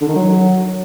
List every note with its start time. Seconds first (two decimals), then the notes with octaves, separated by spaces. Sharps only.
0.01 D3
0.08 D#3
0.16 F#3